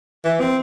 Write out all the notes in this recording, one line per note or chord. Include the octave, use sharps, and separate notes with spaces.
E3
C4